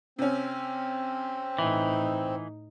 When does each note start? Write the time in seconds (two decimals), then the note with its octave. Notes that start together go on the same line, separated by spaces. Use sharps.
0.18 C3 C4 C#4
1.59 A2 E3 D#4